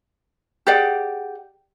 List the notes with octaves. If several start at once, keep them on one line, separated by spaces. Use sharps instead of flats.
G4 G#4 D5 F#5